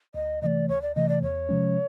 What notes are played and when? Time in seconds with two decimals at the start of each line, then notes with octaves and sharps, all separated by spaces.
0.14 D2 D#5
0.42 C3 E3 A3 D5 D#5
0.69 D2 C#5
0.82 D5
0.95 C3 E3 A3 D#5
1.09 D5
1.22 E2 C#5
1.49 C3 F3 G#3 C#4